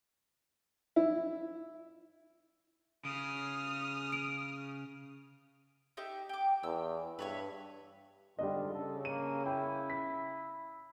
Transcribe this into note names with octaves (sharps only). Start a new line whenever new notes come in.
E4
C#3 D#6 F6 D7
D7 F7
D#4 G4 E5
G5 D6
E2 E6
G2 B4 C#5 E5
G#2 D3 G3 D4 F4 D#5
C#3 A4
A#3 D#7
E4 G5
B6